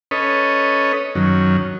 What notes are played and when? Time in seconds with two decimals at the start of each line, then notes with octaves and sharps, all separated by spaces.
0.11 C#4 A4 B4 C#5 D#5
1.15 F#2 D#3 F#3 C#4